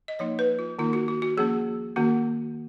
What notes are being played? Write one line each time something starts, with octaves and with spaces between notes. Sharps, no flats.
D#5
F3 A#3 D#4 C#5
B4
F4
D#3 A#3 D#4 F4
F#4
F#4
F#4
F3 A#3 C#4 G#4
D#3 A#3 C#4 F#4